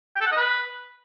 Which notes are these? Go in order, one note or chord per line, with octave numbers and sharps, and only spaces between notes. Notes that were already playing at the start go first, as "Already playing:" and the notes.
G5
A4
F#5
D#5
B4